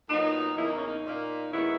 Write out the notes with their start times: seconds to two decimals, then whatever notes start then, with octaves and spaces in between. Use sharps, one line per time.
0.09 A#2 F#3 B3 D#4
0.57 E2 C#3 E3 A#3 E4
0.67 D#4
0.77 C#4
0.87 D#4
1.05 A#2 A#3
1.52 D#2 D#3 G#3 B3 C#4 E4